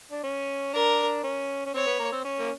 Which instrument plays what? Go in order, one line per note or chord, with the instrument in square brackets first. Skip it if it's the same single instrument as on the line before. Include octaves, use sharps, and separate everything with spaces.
[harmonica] D4
C#4
[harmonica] D4 [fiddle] A#4
[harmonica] C#4
C#4
[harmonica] C4 [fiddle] C#5
[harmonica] B3
A#3
C4
C#4
A#3